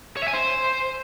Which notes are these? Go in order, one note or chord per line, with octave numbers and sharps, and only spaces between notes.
C#5
E5
G#5
C5